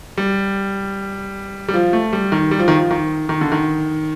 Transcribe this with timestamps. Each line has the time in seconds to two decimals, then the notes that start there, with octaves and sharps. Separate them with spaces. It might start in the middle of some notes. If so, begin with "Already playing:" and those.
0.18 G3
1.68 G3
1.74 F3
1.93 A3
2.13 G3
2.32 D#3
2.51 G3
2.59 F3
2.68 D#3
2.76 F3
2.91 D#3
3.29 D#3
3.41 D3
3.52 D#3